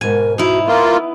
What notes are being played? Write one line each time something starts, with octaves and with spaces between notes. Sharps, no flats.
G#2 B2 A#4 G#5
D#4 E4 F#4
A#3 B3 F4 A#4